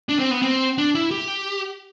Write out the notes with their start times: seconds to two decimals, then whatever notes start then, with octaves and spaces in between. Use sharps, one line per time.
0.09 D4
0.19 C4
0.31 B3
0.42 C4
0.78 D4
0.95 E4
1.11 G4